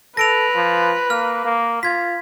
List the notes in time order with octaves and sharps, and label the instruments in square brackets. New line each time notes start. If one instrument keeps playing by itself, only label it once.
[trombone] A4 [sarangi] B4 [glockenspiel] A#6 D7 F7
[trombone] F3
[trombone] A#3 [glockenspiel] F6
[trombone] A#3
[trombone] F4 [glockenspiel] G#6 B6